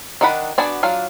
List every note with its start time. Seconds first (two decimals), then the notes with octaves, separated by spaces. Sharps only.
0.21 D#3 D4 D#4 F#5 B5
0.58 B3 D4 F#4 D5 G#5
0.83 F#3 D4 F4 F5